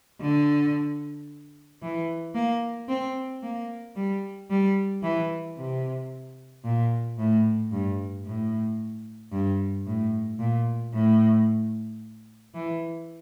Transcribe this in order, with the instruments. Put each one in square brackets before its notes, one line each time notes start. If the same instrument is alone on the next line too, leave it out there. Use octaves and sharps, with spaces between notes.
[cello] D3
E3
A#3
C4
A#3
G3
G3
E3
C3
A#2
A2
G2
A2
G2
A2
A#2
A2
E3